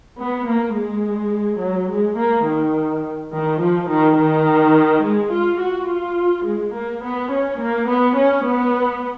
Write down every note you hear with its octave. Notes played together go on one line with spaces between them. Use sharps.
B3
A#3
G#3
F#3
G#3
A#3
D#3
D#3
F3
D#3
D#3
G#3
F4
F#4
F4
G#3
A#3
B3
C#4
A#3
B3
C#4
B3